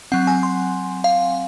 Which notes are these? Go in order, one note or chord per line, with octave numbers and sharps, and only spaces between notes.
F#3 C4 F#5
G#5
C6
F5